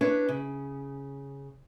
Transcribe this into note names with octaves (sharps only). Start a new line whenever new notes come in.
D4 E4 B4 C#5
C#3